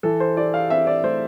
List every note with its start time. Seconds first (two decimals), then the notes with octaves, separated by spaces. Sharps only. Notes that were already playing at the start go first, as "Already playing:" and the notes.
0.03 E3 A4
0.20 C5
0.36 E4 D5
0.54 F5
0.70 C4 E5
0.87 D5
1.04 A3 C5